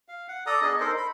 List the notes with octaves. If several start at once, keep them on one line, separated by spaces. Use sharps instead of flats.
F5
F#5
A4 D5 A#5 D#6
B3 D4 G#4 D#5
D#4 A4 A#4 C5
B5